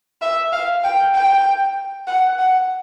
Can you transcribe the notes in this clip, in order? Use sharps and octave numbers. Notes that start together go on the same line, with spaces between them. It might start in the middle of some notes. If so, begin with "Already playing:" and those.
E5
F5
G5
G5
F#5
F#5